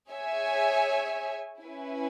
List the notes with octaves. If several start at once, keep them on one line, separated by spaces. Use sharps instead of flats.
G#4 C#5 E5 G#5
C#4 E4 B4 G#5